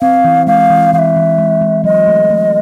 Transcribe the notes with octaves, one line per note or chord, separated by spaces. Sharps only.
C4 F5
E3
G#3 F5
E3
E3 F5
E5
E3
G#3
G#3
F#3 D#5
A3
A3